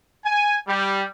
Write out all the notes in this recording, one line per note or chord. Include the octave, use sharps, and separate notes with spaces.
G#5
G3